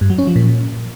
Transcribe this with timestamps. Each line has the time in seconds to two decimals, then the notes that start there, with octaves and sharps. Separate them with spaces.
0.01 G2
0.10 F#3
0.18 C#4
0.27 F3
0.36 A#2